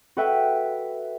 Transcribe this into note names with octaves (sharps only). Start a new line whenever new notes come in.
F#4 A4 B4 E5 G5